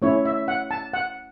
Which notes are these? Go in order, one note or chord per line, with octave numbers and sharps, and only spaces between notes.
A3 C#4 E4 C#5
E5
F#5
A5
F#5